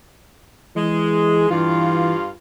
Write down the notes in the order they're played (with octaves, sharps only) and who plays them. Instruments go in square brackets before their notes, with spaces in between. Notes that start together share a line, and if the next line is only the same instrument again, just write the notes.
[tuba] E3 [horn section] G#3
[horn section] G2 F4 [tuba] E3